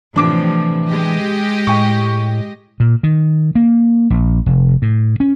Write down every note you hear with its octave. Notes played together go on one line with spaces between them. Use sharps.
A2 C3 E3 F3 D4 D6
G#3 G4 D#5
A2 G5 C#6
A#2
D#3
A#3
A#1
F1
A2
C#4